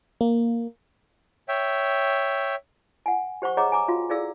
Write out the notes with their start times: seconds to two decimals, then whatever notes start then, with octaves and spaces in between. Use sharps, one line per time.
0.21 A#3
1.48 C#5 E5 G5
3.06 F#5 G#5
3.42 G4 C5 F#5 C#6
3.57 G#4 C#5 D#5 F#5 A#5 D6
3.72 G#5 A#5 D6
3.88 F4 F#4 F5
4.10 E4 G#4 A4 D5 F5 E6